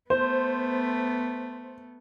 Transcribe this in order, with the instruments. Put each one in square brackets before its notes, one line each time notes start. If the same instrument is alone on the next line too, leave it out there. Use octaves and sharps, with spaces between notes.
[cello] A3 B3 [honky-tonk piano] C5